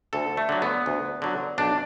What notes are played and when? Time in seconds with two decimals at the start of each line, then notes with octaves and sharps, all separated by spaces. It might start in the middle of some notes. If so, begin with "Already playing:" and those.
0.13 D2 A4
0.37 A3
0.49 D3 F#3
0.62 B3
0.86 D2
1.22 D3 F#3
1.58 B1 D4